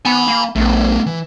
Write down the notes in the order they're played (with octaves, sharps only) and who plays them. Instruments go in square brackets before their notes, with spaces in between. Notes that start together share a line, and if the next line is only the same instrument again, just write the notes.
[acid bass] B3 [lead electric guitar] G#5 B5
[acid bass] A#3
[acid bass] A#1 [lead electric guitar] A3 B3
[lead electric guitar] E3